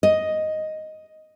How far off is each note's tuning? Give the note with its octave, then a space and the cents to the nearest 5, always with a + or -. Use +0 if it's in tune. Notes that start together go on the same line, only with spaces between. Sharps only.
D#5 +5